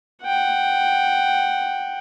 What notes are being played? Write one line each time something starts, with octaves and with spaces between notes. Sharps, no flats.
F#5 G5